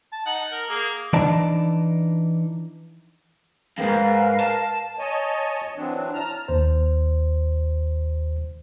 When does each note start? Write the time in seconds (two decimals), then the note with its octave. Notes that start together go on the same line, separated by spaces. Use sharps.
0.13 A5
0.26 D#4 F#5
0.52 A#4
0.70 A#3 G#4
1.13 E3 D4 D#4 D5 D#5 A5
3.78 F2 G#2 A#4 B4 F5
4.40 A5
4.99 C#5 D#5 G#5 A5
5.77 E3 F#3 C4 D4
6.14 A5 A#5 F6
6.48 D#2 C5